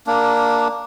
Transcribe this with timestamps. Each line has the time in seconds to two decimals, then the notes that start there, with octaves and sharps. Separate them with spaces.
0.07 A#3 D4